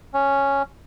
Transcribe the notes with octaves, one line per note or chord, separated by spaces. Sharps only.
C#4